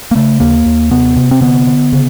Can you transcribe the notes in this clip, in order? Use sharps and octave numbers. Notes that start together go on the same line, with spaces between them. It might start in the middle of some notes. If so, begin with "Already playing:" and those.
A#3
C#3 A3
D#2 A#3
D#2
C3 B3
C3
C4
D3 B3
D3
C#3